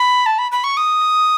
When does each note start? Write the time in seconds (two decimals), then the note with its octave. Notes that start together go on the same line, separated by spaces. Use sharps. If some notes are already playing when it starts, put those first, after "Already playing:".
Already playing: B5
0.26 A5
0.38 B5
0.52 B5
0.64 C#6
0.77 D#6